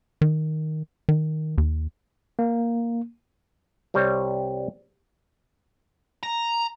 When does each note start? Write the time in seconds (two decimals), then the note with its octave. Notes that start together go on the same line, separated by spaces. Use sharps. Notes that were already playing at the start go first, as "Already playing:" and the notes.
0.21 D#3
1.09 D#3
1.58 D#2
2.39 A#3
3.94 C2 G3 C4 C#5
6.23 A#5